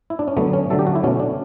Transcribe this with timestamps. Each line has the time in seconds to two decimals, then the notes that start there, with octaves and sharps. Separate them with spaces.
0.10 E4
0.19 D4
0.28 C#4
0.37 D3 F#3 A3 B3
0.53 C#4
0.70 D3 F#3 A3 A4
0.79 G4
0.87 F#4
0.95 E4
1.04 B2 A3 C#4
1.20 D4